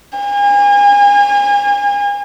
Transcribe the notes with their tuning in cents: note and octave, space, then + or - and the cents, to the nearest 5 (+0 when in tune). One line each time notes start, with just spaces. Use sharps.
G#5 -35